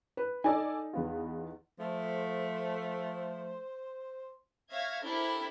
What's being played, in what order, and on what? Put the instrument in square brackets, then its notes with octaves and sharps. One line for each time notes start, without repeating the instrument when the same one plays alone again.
[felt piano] B4
[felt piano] D#4 [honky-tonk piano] A4 D5 G#5
[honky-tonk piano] E2 B3 F4
[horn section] F3 A3 [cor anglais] C5
[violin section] C#5 E5 F5 G#6 A#6
D4 E4 G4 A4 A#4 C5